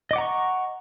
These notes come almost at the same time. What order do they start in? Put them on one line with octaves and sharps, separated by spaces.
D#5 D6 F#5 A#5 C#6